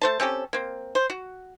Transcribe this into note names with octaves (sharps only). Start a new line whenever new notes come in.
A3 C5 A5
C4 C#4 G4 A4
A#3 C4
C5
F#4